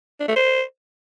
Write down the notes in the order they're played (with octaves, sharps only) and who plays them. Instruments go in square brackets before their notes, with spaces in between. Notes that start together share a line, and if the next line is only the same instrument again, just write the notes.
[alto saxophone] D4
A3
C5